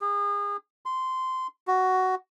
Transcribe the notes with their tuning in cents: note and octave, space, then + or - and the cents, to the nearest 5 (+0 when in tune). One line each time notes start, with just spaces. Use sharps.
G#4 -35
C6 -15
F#4 +10